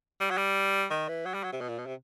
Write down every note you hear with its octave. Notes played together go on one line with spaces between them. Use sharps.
G3
F#3
G3
D#3
E3
F#3
G3
F#3
C3
B2
A#2
B2
C3